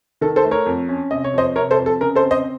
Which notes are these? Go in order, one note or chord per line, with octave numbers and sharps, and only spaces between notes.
D#3 A4
A4 C5
A3
A#4 C#5
F2
C#4
C3 D#5
C#5
F2 C5 D#5
C3 A#4 C#5
A4 C5
F2
A4
C#3 A#4
A4 C5
C4
C5 D#5